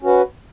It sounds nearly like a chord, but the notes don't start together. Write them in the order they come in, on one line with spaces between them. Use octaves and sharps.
C#4 F#4 B4